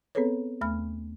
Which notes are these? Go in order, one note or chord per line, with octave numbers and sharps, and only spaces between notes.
B3 C4 G#4 A4 B4 C#5
D#2 A3 B5 F6